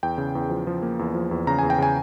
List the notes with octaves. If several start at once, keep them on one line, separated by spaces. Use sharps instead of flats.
E2 G5
C#3
E2
F3
F3
A#3
E2
F3
E2
C#3 A#5
E2 G#5
G5
C#3 G#5